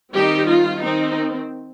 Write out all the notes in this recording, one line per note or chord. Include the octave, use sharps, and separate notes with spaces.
D#3 G3 C4 D#4 G4
F4
D#3 C4 D#4